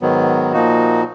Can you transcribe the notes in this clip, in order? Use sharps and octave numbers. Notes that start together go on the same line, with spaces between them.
G#2 D#3 F#3 B3
A#2 F3 A#3 D#4 F#4